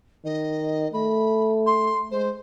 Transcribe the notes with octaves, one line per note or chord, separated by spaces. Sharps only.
D#3 D#5
A3 B5
C6
G#3 C5